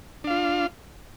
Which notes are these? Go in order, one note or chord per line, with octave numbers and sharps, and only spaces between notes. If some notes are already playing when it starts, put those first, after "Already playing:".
D4 F4 F5